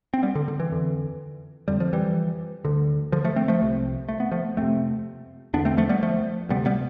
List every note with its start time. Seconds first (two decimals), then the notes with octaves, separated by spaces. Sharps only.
0.14 C4
0.23 G3 B3
0.35 D3
0.48 D3
0.60 E3
0.71 F2 D3
1.68 F2 D3 G3
1.80 F3
1.93 E3 G3
2.65 D2 D3
3.12 D3 F3
3.25 F3 A3
3.36 A3 C4
3.48 F3 A3
3.61 C2 C3
4.09 A3
4.20 B3
4.32 F3 A3
4.57 F2 C3 A3 C4
5.53 E2 D3 B3 D4
5.65 A3 C4
5.77 F3 A3
5.89 G3 B3
6.03 F3 A3
6.49 D2 C3 G3 B3
6.66 G3 B3